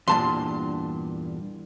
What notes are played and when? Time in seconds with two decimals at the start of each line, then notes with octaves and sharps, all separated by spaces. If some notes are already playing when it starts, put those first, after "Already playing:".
0.08 E2 G2 A#2 D4 A5 C6